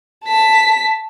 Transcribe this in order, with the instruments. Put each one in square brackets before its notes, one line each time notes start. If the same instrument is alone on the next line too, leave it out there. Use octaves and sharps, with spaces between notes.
[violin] A5 B6